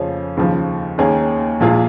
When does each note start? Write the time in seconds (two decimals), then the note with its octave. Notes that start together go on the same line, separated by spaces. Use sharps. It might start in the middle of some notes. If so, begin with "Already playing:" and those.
Already playing: F2 C#3 F3 C#4
0.37 D#2 C#3 F3
0.98 D#2 D#3 A#3 C#4 G#4
1.60 A#1 A#2 A#3 F4 G#4